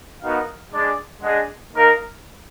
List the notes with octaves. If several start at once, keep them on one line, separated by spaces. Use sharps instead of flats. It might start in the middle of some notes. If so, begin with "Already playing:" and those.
B3 D#4 F#4 A#4 F5
G#3 D4 G#4 D5
G#3 D4 G#4 D#5 F#5
A#3 D#4 A#4 F5